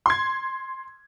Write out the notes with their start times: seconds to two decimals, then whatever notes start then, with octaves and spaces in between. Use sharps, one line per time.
0.06 C6 G#6